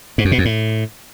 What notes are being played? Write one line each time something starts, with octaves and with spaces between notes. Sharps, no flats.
G#2
F#2
B2
F2
A2